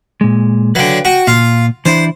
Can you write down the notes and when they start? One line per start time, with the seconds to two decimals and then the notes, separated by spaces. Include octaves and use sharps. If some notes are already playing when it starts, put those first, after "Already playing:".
0.21 A#2 G#3
0.75 D3 F#3 B4 F5 G5
1.05 F#4 G5
1.27 A#2 F4
1.85 E3 D4 E4 C5